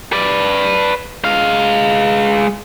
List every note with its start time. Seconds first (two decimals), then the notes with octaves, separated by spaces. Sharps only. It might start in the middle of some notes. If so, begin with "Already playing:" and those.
0.13 B4 D5
1.25 G#3 F5